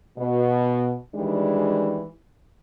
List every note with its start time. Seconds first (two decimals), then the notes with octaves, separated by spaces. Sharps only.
0.18 B2
1.15 D#3 E3 G3 G#3 D4